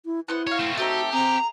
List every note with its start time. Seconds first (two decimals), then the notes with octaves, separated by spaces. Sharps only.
0.05 E4
0.28 B3 E4 C5 F#5
0.47 F#4 C#5 F5
0.60 A3 C4
0.78 A3 C4 D#4 F#4 G4
1.12 C4 G#4 A#5